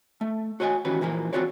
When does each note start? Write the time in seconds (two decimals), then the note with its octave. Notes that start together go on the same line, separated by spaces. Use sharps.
0.21 A3
0.60 F#4 C#5 D#5 F5 G#5
0.85 D#3 E3 C#4 F#4 G4 B4
1.01 A#2 E3 F3 A#3
1.33 C4 C#4 F4 F#4 C#5 D5